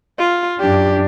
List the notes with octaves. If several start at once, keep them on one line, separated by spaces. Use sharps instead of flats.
F4
F#2 D4 G4